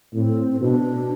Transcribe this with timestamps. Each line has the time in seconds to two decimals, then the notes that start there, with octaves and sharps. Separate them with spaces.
0.14 A2 C4
0.52 C4
0.61 B2 D4